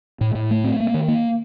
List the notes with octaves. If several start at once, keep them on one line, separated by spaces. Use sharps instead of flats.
A2
A2
A3
C4
A#3
D#3
A#3